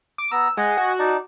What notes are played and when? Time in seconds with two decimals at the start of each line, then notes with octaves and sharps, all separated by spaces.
0.18 D6
0.32 B3 A#5 E6
0.57 G#3 D#5 F#5 G#5
0.78 F#4
0.99 D#4 D5 A5